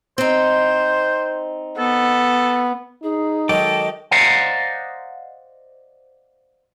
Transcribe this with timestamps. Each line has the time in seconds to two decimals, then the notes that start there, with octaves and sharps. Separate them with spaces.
0.18 C4 D#4 C5
1.78 B3 A4
3.03 D#4 G#4
3.49 D#3 F#3 G#3 A4 D#5 G5 D6
4.11 C5 D5 D#5 F5 F#5 A#5